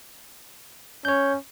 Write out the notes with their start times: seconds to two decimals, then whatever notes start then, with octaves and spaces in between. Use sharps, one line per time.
1.05 C#4 C#5 G6